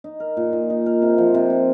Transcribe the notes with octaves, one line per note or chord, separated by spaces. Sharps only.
D#4
A#4
A#2
A#2
D#4
A#4
C3
F3
C3
C3